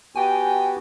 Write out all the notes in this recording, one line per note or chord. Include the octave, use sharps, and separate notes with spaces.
B3 F#4 G4 G5 G#5